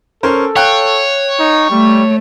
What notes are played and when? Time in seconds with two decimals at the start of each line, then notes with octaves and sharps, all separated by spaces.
0.23 C#4 A4 A#4 C5
0.56 C#5 F5 G5 F#6
1.40 D#4
1.71 G3 A3